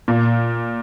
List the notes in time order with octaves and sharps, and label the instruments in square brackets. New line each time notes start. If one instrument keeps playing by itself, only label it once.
[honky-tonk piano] A#2